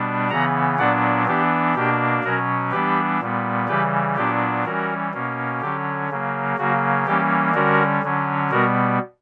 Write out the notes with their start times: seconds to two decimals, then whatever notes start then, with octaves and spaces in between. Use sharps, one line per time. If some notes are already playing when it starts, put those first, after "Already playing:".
Already playing: B2 G3 B3 D4
0.30 C#3 E3 B3 F#5 A#5
0.78 A#2 F#3 B3 D4 D5 F#5
1.27 E3 B3 D4 G4
1.75 B2 A#3 D4 G4
2.24 B2 F#3 C#4 F#4 A#4
2.71 E3 G3 B3 D4 G4 B4
3.20 A#2 G3 B3
3.68 C#3 E3 G3 G4 B4
4.16 A#2 F#3 B3 D4 G4
4.64 E3 G3 C#4 F#4 A#4
5.14 B2 A#3 C#4
5.61 D3 F#3 C#4 G4
6.10 C#3 F#3 A#3
6.58 C#3 F#3 A#3 F#4
7.06 E3 G3 A#3 C#4 G4
7.54 D3 G3 C#4 F#4 A#4
8.03 D3 F#3 C#4
8.50 B2 G3 B3 F#4 A#4